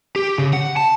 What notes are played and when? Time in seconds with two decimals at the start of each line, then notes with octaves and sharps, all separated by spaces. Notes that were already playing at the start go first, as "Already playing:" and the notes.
0.16 G4
0.38 C#3
0.53 F#5
0.77 A5